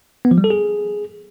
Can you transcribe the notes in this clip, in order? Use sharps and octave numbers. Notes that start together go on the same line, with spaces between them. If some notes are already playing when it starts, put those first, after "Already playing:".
B3
F3
G3
A4
G#4